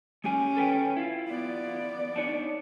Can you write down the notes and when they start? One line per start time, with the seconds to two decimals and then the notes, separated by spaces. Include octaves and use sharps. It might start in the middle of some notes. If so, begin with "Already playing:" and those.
0.24 G#3 C#4 G4 G#5
0.57 A4 B4 G5
0.97 E4 F4
1.28 B3 D5
2.16 D4 D#4 C#5